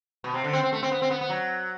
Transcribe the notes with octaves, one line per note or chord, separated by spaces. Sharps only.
B2
C3
D3
C4
C4
A3
C4
B3
C4
B3
B3
F#3